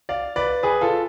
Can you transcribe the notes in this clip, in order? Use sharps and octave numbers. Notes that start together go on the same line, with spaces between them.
D5 F5
B4 D5
G#4 B4
F4 A4